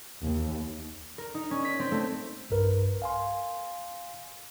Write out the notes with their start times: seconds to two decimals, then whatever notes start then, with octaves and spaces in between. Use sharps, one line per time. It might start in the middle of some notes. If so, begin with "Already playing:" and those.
0.24 D#2
1.18 A#4
1.34 D#4
1.51 C#4
1.64 B6
1.79 C4
1.91 A3
2.50 B1 G2 A#4 B4
3.02 F5 G#5 C6